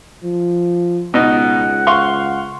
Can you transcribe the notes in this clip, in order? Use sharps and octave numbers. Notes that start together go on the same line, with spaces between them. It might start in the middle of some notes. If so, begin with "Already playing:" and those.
F3
C#2 B2 D#4 F#5
F5 C6 C#6